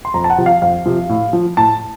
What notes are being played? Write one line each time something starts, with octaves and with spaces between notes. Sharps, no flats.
C6
F2 A#5
A5
F#5
C3 F3
F5
F2 F5
C3 F3
A2
F3
A2 A5